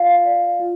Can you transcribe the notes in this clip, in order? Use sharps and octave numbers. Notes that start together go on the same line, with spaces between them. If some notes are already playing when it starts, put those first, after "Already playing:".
Already playing: F4 D5 F5
D5
F4